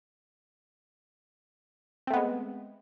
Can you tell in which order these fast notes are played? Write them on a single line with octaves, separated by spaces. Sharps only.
C4 A3 B3 G#3